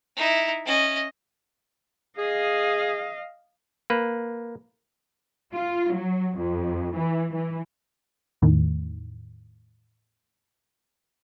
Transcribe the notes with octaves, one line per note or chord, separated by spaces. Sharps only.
D#4 E4
C#4 D#5
G#4 D#5 F5
A#3 B4
F4
F#3
F2
E3
E3
E2 A2 D#3